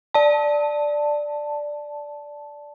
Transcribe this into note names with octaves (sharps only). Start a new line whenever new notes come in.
D5 A5